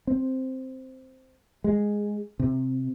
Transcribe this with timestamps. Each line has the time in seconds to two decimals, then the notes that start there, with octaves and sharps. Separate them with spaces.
0.07 C4
1.64 G#3
2.40 C3